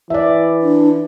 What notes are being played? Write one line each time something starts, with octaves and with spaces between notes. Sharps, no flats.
E3 D5 E5
D4